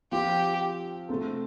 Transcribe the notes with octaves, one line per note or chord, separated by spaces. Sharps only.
F3 C4 F4 G4
C3 A3 C4 A4